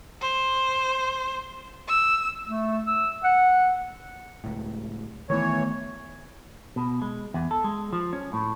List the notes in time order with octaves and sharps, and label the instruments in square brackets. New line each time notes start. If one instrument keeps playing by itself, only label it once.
[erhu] C5
E6
[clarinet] A3
E6
F#5
[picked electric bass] C#2 A2
[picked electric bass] D#3 A3 B3 [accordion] E3 C#5
[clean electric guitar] B2
G#3
E2
A4
G#3
F3
C#4
A2